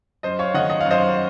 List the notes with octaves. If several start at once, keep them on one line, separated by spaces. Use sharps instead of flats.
F#2 C5 D#5
C#5 F5
D#3 A3 D#5 F#5
D#5
F5
F#2
C5 D#5